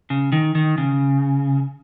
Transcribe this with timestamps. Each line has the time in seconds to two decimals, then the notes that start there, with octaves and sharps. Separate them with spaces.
0.10 C#3
0.32 D#3
0.55 D#3
0.78 C#3